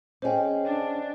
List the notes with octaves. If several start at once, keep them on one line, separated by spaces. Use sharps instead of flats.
C#4 G#4 C5 D#5 G5
D4